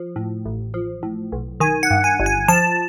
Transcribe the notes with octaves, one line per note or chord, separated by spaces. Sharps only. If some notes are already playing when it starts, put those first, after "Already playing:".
Already playing: F3
A2
A1
F3
A2
B1
D#3 G#5
F#5
G2
G#5
G1
G#5
F3 A5